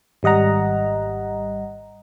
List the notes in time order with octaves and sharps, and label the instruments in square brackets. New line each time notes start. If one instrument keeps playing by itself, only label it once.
[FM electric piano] G#1 G3 D#5 F#5 A#5